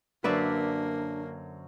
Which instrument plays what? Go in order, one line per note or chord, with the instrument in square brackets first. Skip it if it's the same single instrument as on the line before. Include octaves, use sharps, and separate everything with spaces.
[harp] F#2 D3 C5 [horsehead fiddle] A#3 [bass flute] D4 [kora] B4 D5 E5